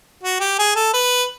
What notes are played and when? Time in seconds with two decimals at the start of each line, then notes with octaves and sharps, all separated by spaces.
0.23 F#4
0.40 G4
0.58 G#4
0.75 A4
0.93 B4